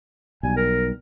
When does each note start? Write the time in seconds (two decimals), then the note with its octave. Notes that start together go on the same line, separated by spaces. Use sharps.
0.43 B1 G3 G#5
0.57 A#4